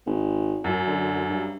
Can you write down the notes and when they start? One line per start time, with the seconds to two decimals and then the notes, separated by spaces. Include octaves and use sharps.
0.06 G#1
0.64 F#2
0.87 D3
1.29 G2